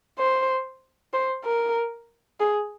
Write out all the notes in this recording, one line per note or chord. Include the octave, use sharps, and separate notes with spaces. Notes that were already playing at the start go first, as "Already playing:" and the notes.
C5
C5
A#4
G#4